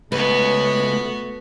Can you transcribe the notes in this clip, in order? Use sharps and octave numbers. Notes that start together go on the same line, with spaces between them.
C#2 A3 B3 F#4 B4